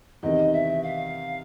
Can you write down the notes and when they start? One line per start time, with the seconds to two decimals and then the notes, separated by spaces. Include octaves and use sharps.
0.23 E2 C3 D#3 D#5
0.53 E5
0.82 F5